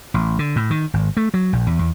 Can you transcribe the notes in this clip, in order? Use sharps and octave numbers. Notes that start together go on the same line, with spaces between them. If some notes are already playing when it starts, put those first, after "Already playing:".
A1
D3
A2
D#3
G#1
A3
F#3
A#1
E2
E2